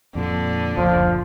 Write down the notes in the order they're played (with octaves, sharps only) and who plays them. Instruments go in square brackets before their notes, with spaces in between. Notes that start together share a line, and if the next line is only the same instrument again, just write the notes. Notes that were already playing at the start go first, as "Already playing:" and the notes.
[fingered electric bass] F2 A#2 [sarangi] D3
[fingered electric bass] F#1 D2 A#2 [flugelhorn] F3